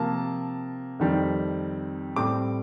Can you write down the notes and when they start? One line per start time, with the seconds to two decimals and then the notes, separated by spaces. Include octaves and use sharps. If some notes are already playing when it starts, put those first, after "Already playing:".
Already playing: C3 F3 A#3 A5
0.99 F2 D#3 G3 C4
2.16 A2 G3 C4 D6